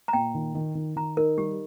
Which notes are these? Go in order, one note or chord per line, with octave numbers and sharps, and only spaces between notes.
A#5
A#2 G5
D#3
D#3
D#3
D#3 A#5
D#4 A#4
G3 G4